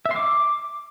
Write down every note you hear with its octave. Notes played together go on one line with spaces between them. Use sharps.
E5
C6
D6